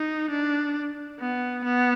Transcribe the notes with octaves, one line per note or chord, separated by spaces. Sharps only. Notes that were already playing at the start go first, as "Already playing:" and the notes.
Already playing: D#4
D4
B3
B3